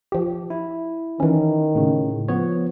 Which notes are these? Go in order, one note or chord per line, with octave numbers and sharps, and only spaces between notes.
F3 G4
E4
D#3 E3 C#4
A2 C#3
F3 B3 C#5